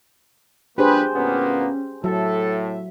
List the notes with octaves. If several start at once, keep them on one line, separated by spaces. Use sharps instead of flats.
F3 A#3 D4 G4 G#4 B4 C5
D2 A#2 A#3 B3 C#4
A2 F#3 A4 E5